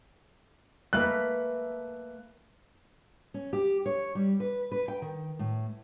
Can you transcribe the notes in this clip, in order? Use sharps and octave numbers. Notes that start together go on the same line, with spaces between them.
A3 A#3 B4 F#6
C#4
G4
C#5
G3
B4
B4
G5
D#3
A2